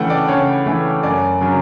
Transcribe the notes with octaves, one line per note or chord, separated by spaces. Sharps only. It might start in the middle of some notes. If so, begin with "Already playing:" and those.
Already playing: C#3 E3 A3 F#5 G5 A5
D5
C#3 C#5
E3 A3
F#2 D5
C#3 F#3